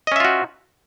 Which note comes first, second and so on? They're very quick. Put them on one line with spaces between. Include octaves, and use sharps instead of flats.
D#5 C#4 E5 F4 F#4